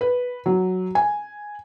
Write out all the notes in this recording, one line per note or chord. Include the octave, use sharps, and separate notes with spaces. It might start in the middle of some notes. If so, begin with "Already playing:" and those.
B4
F#3
G#5